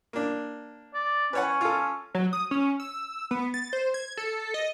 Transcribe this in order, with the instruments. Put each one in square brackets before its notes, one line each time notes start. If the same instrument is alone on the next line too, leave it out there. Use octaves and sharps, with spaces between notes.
[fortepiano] A#3 D4
[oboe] D5
[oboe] C#4 [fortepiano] B4 C#5 F#5
[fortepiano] F4 A4
[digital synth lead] F#3
D#6
C#4
E6
B3
A6
C5
G#6
A4
D#5